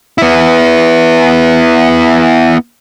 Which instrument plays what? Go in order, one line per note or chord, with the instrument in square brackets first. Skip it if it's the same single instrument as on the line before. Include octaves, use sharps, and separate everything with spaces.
[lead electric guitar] B3 E4